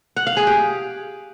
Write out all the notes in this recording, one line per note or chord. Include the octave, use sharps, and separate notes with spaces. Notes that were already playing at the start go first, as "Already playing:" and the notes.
F#5
F5
G#4
G4